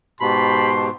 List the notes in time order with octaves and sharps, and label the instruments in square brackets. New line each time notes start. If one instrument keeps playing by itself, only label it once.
[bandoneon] G#2 B2 [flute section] G4 A5 [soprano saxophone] B5 [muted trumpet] C6